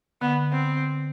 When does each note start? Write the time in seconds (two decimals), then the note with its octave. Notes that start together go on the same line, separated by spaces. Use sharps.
0.21 D3 B3
0.52 C4